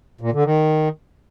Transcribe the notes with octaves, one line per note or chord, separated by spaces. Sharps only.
A#2
D3
D#3